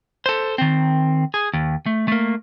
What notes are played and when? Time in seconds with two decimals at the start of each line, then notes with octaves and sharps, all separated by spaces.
0.26 A4 C5
0.58 D#3 C4
1.34 G#4
1.53 D#2
1.86 A3
2.08 A3 A#3